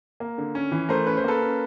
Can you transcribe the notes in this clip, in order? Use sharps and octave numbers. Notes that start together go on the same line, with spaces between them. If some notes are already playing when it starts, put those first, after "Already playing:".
A#3
D3
C#4
E3
A3 A#4 C5
C#4 B4
C5
A#3 A4 B4
C#4